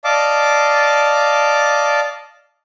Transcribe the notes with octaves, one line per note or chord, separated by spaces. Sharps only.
D5 D#5 F5 A5 D6